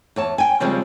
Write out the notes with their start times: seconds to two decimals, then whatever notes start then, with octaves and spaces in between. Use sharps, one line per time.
0.16 E2 C#5 A5
0.38 G5 G#5
0.60 C#3 F3 G3 G#3 C4